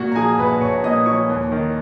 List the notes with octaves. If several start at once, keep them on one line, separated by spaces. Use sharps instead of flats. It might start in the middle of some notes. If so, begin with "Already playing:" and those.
Already playing: A#2 F#4 F#5
A#5
F3 G#4 G#5
A#1 B4 B5
A#1 C#5 C#6
A#2 D#5 D#6
F3 C#5 C#6
D#2
D#3